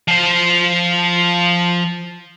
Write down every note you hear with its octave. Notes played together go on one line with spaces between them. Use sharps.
F3 C5